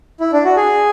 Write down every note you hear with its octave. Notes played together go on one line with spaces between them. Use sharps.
E4
D4
F#4
G#4